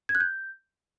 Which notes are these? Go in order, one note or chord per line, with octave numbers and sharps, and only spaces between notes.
G#6
F#6
G6